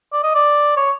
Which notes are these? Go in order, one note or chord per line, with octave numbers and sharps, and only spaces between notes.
D5
D#5
D5
C#5